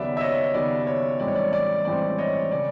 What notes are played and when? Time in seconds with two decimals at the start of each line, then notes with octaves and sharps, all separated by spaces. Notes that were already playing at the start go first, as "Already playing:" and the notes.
Already playing: D#2 C#3 F#3 B3 D5 E5
0.17 E5
0.21 C#5 D#5
0.54 D#2 C#3 F#3 B3 D5
0.87 C#5
1.20 A1 G2 E3 G#3 C4 D5
1.28 C#5
1.35 D5
1.53 D5
1.85 A1 G2 E3 G#3 C4 D5
2.18 C#5 D#5
2.51 C#3 D5